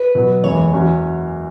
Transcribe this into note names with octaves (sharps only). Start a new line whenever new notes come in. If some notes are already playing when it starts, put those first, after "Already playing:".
Already playing: B4
B2 F#3 B3
F#1 E2 C#3 E3 G#3 C#5
E2 E3 C#4 F#4